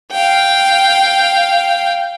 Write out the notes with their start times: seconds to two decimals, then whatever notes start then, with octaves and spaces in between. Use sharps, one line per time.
0.12 F5 G5